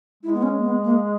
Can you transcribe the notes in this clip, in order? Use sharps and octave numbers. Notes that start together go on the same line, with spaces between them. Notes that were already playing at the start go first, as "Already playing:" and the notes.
G#3 E4
B3
C#4
A#3
B3
A#3